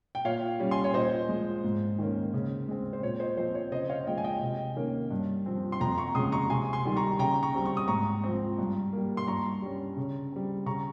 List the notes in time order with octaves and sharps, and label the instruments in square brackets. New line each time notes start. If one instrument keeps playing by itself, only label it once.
[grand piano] G5
A#2 C#5 F5
G3 C#4
G#5 C6
C#5
A#2 C5 D#5
F3 G#3
G#2
D#3 A#3 C#4
C#3
G#3 C4
C5
A#2 C#5
C5 D#5
F3 C4 C5
C#5
C#3 C5 D#5
C#5 F5
F3 G#3 D#5 G5
G#5
D#5 G5
C3
D#3 A#3 C#4
G2
F3 C4
C6
F2 G5 A#5
A#5 C#6
C#3 G#3 C6 D#6
A#5 C#6
C3 G#5 C6
G#5 C6
D#3 G3
A#5 C#6
C#3 G5 A#5
A#5 C#6
G3 C4
C#6
D#6
G#2 A#5 C#6
F3 C4
G2
G3 A#3
C6
G2 A#5 C#6
G3 C#4
C#3
G3 C4
C#3 A#5 C#6